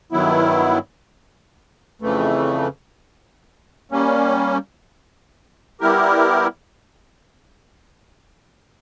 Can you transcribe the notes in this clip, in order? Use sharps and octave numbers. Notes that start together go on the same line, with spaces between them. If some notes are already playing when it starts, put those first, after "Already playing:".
G2 D#3 F#3 B3 E4
F2 C#3 E3 A3
G3 A#3 C#4
G3 B3 E4 G4 A#4